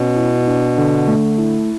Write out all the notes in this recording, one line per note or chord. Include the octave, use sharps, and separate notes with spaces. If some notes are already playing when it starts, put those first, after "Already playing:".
Already playing: B2 C#4
E4
D4
D3
A3
E4